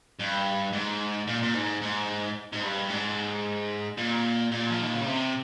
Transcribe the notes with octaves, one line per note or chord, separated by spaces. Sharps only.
G2
G#2
A#2
A#2
G#2
G#2
G#2
G2
G#2
A#2
A#2
F3
D#3
C#3
C3